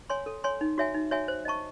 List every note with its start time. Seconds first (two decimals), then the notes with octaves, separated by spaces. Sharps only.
0.10 C#5 G#5 C6
0.26 A4
0.44 C#5 G#5 C6
0.61 D#4
0.78 F#4 C#5 E5 G#5
0.95 D#4
1.11 F#4 C#5 E5 G#5
1.28 C5
1.45 D#5 A5 C#6